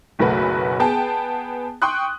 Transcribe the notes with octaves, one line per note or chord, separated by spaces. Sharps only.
F#1 B1 F#3 A3 F#4 B4
B3 G#4 G5 A5
G5 C6 C#6 D#6 F#6